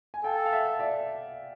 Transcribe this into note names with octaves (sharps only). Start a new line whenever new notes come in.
G#5
A4 F5 G5
F5
E5 F#5
D5 E5